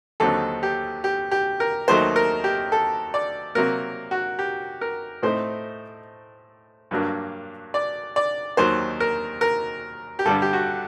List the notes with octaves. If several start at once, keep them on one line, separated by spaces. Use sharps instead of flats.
D#2 D3 F#3 C4 D#4 A4
G4
G4
G4
A#4
D#2 D#3 F#3 A3 D#4 C5
A#4
G4
A4
D5
C3 F#3 A#3 A#4
F#4
G4
A#4
A2 A3 C4 D#4 C5
G2 F#3 A#3 D4
D5
D5
D#2 D#3 F#3 C5
A#4
A#4
G4
G2 D3 G3 D4 A4
G4
F#4